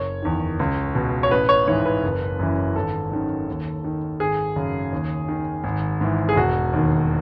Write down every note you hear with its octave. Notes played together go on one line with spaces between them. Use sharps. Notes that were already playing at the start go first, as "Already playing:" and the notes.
Already playing: F#1 C#5
E2 D#3
C#2
B2
C#5
A1 B4
C#5
G#2 E3 C#5
B4
F#1
F#2 E3
G#1 A4
F#2 D#3
D#2
D#3
G#1 G#4
F#2 C#3
D#2
D#3
G#1
G#2 E3
G#4
E1 F#4
D#2 D#3